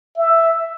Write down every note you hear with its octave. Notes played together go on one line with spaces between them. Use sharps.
E5